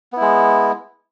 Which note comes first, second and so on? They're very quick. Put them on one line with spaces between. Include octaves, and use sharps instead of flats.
B3 E4 G#3